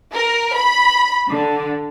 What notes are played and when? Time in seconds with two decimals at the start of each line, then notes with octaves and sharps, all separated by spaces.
0.13 A#4
0.55 B5
1.30 D3